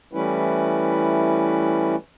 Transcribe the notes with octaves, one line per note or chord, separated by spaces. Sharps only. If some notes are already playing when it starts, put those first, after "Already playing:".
E3 G3 A3 C#4 E4 B4